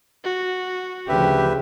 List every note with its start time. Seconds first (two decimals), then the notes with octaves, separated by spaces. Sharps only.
0.24 F#4
1.09 D2 C#3 F3 G4 B4 E5